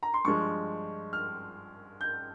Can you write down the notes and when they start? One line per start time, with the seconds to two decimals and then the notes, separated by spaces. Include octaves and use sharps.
0.03 A#5
0.14 C6
0.25 G2 F3 G#3 C#6
1.13 F6
2.01 G6